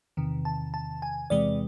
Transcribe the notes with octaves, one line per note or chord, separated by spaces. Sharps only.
E2 C3 D#3
A5
A5
G#5
E2 C3 E3 G#3 D5